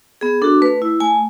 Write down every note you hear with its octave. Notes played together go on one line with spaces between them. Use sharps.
B3 G#4
D4 F#4 A4
A3 B4
E4
A3 G#5